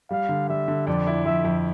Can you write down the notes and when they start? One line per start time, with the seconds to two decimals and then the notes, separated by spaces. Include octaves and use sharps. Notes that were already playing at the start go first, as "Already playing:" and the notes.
0.11 G3 F5
0.29 D3
0.49 G3 E5
0.68 D3
0.87 F2 D5
1.07 E4
1.25 F2 E5
1.45 F2